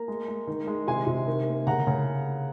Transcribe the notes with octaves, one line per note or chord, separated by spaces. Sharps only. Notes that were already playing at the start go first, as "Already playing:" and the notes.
Already playing: A#3 A#5
G#3
G#3
D#3
G#3
C3 G#5 C6
C3
D#3
A#3
C#3 F#5 A#5
C#3